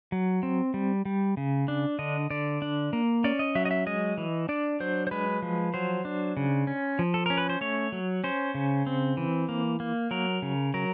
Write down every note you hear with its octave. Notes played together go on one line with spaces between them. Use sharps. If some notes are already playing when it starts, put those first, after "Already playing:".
F#3
C4
G3
G3
C#3
D4
D3 D#5
D3 D5
D4
A#3
C#4 D5
D#5
F#3 E5
D#5
E5
G#3 D#5
E3
D4 D5
F#3 C5
C5
G#3 B4
F3
F#3 C5
D4
C#3
C#4
F3
A4
C#4 A#4
B4
C5
A3 C#5
F#3
C#4 C5
C#3
C4
E3
A#3
A#3
F#3 A#4
C#3
F#3 A#4